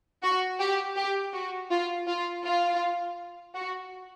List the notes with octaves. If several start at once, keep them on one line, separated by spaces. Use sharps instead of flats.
F#4
G4
G4
F#4
F4
F4
F4
F#4